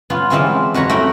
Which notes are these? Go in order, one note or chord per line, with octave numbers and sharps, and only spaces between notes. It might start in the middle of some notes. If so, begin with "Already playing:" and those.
B3 C#4 F4
E3 F3 G#3 C4 C#4 F4
F2 F#4 B4 C#5 A#5
A3 C#4 E4 F#5 G5 A#5